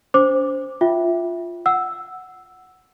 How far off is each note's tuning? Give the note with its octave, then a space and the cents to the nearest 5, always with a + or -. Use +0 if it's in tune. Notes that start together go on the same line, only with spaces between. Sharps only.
D4 -40 C5 +0 D6 +0
F4 +0 E5 +0 G5 -15
F#5 +0 E6 +0